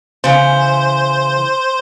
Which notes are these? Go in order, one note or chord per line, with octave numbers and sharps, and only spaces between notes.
C#3 E3 C5